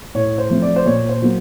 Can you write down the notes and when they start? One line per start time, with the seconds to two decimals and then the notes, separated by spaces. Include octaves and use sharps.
0.15 A2 C#5
0.38 C5
0.50 F3 A3 C4
0.62 D5
0.76 C5
0.86 A#2 C#5
1.09 C5
1.22 F#3 A#3